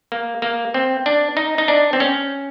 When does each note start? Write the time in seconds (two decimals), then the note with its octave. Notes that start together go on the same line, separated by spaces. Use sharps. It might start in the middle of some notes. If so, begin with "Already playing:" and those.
0.12 A#3
0.42 A#3
0.74 C4
1.06 D4
1.37 D#4
1.58 D#4
1.68 D4
1.93 C4
2.00 C#4